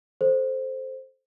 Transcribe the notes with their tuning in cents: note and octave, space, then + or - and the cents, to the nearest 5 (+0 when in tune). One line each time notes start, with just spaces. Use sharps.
A4 -15 C5 +0